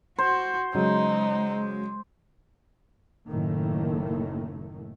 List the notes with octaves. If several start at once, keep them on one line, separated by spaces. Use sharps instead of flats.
F#4 C5
C#3 F#3 G#3 D#4
F#1 A2 D#3 A3 A#3